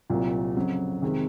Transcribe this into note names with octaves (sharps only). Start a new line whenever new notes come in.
C2 A#2 F#3
F2 C#3 F#3
F2 C3 D#3 G#3